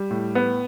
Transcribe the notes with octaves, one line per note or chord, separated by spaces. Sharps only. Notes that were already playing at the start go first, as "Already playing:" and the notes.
Already playing: G3
A2
B3